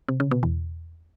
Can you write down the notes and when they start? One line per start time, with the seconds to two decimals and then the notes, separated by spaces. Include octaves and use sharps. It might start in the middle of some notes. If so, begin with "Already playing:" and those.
0.08 C3
0.20 C#3
0.31 B2
0.43 E2